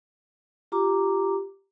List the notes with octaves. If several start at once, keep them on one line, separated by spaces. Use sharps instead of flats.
F4 G4 A#5 D6